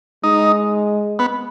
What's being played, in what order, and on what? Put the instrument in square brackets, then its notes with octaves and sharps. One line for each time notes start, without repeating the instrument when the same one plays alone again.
[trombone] G#3 [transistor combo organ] D#4
[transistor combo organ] B3